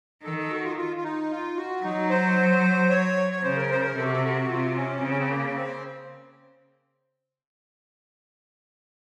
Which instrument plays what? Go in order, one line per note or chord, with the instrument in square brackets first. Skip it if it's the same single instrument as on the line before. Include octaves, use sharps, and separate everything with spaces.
[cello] D#3 [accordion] A4
[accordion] A4
F#4
F4
F4
F4
D#4
F4
F#4
[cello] F#3 [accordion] D#4
[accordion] C5
C#5
C#5
[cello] C#3 [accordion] C5
[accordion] A#4
C5
A#4
[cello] C3 [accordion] A4
[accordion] F#4
A4
F#4
[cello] C3 [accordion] F4
[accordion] C#4
[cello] C#3 [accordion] C4
[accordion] C#4
C4
A#3
C4